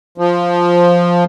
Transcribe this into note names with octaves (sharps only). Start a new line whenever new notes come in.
F3